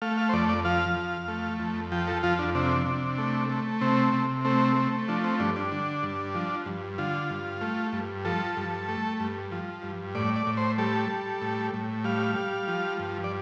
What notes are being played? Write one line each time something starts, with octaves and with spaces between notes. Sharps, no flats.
A3 F5
F5
C5
F2 D5
D5
F3 F5
F2
A3
F2
F3 G5
A4
F2 F4
D4
C3 D4
C3
A3
A3
C3 C4
C3
A3 C4
A3
F3 D4
C4
G2 D4
D4
D3
G2
F3
G2
D3 F4
G2
A3
G2
F3 A4
G2
A3
G2
F3
G2
A2 D5
D5
A2
C5
G3 A4
G3
A2
A2
G3 F5
G3
F3
G2
D5